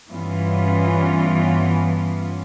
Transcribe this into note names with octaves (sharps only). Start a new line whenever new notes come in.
G2 E3 B3 C#4 F4